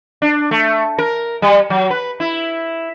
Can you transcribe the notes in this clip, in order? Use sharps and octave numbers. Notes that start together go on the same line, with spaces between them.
D4
A3
A#4
G3
F#3
B4
E4